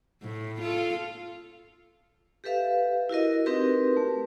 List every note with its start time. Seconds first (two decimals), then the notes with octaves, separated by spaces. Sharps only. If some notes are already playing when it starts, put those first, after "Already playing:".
0.22 A2
0.61 F4 A4
2.44 G4 A4 B4 E5 F5
3.09 E4 F#4 A#4 D#5
3.46 C4 D#4 F#4 G4 A#4 B4
3.97 A3